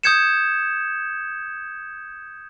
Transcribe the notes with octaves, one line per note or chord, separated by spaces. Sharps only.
D#6 G6 G#6 C#7 E7